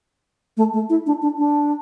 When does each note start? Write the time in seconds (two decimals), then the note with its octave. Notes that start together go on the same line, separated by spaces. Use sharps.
0.57 A3
0.73 A3
0.90 E4
1.06 D4
1.22 D4
1.38 D4